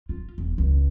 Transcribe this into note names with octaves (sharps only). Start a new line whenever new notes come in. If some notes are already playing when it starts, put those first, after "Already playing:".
F4
E1
C#2